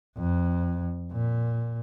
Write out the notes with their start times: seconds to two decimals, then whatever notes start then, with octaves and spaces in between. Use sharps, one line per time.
0.17 F2
1.11 A#2